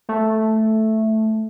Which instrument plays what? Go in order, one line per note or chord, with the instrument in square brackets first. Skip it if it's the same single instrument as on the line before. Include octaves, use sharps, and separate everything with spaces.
[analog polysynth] A3